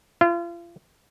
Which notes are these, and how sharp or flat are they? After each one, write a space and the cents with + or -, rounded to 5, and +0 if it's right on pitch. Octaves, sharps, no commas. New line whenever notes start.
F4 -35